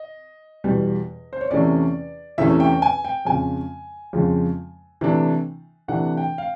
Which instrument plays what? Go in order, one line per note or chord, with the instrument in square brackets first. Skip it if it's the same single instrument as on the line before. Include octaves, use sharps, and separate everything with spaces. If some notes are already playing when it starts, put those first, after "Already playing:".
Already playing: [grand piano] D#5
E2 B2 G3
C5
C#5
E2 C3 E3 A3 C#4 D5
E2 C3 E3 A3 C#4 E5
G5
G#5
G5
F2 C#3 F3 G#3 G#5
F2 C#3 F3 G#3
C3 E3 A3 D4
C3 E3 A3 D4 F#5
G5
F5